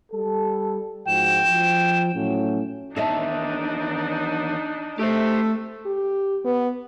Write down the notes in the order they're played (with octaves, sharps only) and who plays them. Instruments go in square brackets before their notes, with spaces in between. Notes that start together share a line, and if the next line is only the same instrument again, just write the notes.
[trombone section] G3 A4
[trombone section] G#2 F3 F#4 [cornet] G5 [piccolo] E7
[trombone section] F3
A2 F#3 C#4
[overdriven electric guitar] E2 D#3 [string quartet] D4 D#4 [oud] A4 D#5 E5
[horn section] A3 [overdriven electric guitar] G4 C5
[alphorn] G4
B3